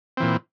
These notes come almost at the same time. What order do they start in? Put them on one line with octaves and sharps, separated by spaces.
C4 E3 A#2